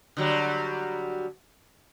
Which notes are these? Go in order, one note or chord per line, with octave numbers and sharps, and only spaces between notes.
D3 F#3 G3